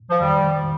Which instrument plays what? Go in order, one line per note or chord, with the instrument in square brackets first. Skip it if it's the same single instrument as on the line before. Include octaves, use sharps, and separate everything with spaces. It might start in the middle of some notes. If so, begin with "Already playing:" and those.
[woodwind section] F3
[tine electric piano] G1 F2 D#3 [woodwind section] G3